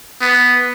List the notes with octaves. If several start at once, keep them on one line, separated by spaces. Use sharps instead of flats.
B3